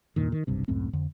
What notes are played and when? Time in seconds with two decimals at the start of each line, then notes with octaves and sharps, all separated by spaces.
0.16 E2 G2 A#2 D#3
0.32 D#3
0.47 F1 B1 G2 C3
0.68 C#2 F#2 A2 C4
0.93 F2 D3